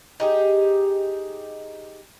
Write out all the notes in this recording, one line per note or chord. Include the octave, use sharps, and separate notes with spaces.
D#4 G4 G#4